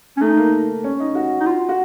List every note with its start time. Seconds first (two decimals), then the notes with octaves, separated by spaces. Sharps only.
0.17 C#4
0.21 A3 D#4
0.37 A#3
0.84 C#4
1.00 D#4
1.15 F#4
1.40 D#4
1.46 F4
1.69 F#4